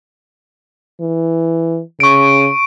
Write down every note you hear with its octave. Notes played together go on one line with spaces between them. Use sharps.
E3
C#3 C#6 D7